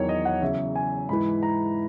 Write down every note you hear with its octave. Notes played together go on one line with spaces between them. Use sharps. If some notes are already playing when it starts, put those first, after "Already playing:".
Already playing: E2 D#3 F#3 C#5
D#5
F#5
E2 C#3 F#3 E5
G#5
G#2 E3 B5
A#5